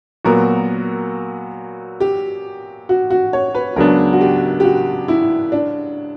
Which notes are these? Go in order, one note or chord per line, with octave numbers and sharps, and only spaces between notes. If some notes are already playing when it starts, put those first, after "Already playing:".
A#2 F#3 B3 F#4 A#4
G4
F#4
F#4
C#5
B4
C#2 C#3 F#3 B3 D4 A#4
F#4
G4
G4
F#4
E4
D4